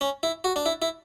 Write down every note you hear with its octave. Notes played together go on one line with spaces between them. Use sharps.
C#4
E4
F#4
D4
E4
E4